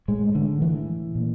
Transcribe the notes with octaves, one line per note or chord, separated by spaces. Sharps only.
A2 G#3
D3
E3
A#2